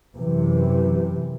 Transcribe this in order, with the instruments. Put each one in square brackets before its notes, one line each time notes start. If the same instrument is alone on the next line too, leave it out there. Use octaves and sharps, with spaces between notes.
[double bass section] F#2 C3 E3